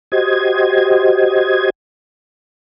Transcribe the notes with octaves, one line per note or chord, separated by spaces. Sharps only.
F#4 G4 C5 D#5 G#6